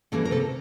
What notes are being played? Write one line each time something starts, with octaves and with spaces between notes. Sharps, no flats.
E3 G3 A#3 C#4 A4
A#4
C3 A4